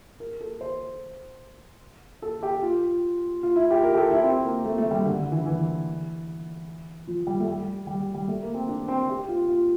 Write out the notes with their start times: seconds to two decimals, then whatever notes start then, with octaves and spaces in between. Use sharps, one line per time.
0.20 A#4
0.41 A4
0.61 C5
2.22 A4
2.43 G4
2.62 F4
3.43 F4
3.56 E4
3.71 G4
3.83 A#4
3.93 G4
3.97 A4
4.11 E4
4.23 C4
4.44 A#3
4.64 A3
4.78 A3
4.91 G3
5.05 D3
5.18 D3
5.32 E3
5.45 E3
7.07 F3
7.27 G3
7.40 A3
7.47 G3
7.87 G3
8.14 G3
8.28 A3
8.42 A#3
8.54 C4
8.69 D4
8.88 C4
9.09 G4
9.28 F4
9.49 F4